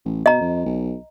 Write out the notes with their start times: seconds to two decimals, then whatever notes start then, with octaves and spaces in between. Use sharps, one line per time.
0.05 A1
0.26 B2 D#5 A#5
0.41 F2
0.66 B1